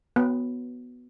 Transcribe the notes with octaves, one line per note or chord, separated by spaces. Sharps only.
B3